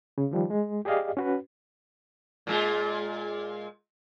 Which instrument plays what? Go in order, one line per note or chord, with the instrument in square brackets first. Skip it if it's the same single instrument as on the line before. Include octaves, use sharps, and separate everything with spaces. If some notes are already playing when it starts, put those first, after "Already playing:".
[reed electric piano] C#3
D#3 F3 G3
G#3
G4 G#4 D5 D#5 F5
C#4 F#4 B4
[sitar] A#2 G#3 F4